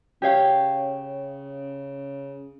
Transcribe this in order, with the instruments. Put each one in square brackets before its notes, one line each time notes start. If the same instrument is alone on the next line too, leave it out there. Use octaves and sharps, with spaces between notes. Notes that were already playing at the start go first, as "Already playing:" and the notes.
[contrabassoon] C#3 [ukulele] G4 C#5 F5